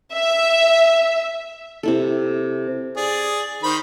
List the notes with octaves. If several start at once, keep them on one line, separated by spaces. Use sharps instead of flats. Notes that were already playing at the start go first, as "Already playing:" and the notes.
E5
C3 E4 A4
G#4 D5
D#3 C5 B5